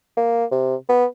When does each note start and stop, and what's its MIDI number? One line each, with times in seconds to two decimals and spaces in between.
0.17 0.45 58
0.51 0.75 48
0.89 1.05 59